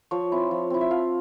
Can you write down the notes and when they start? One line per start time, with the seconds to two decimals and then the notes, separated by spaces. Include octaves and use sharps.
0.11 F3 C#5
0.32 C4 E4
0.51 F3
0.70 C4 E4
0.81 E5
0.90 F3 F5